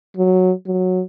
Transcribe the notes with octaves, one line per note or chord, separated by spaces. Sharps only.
F#3
F#3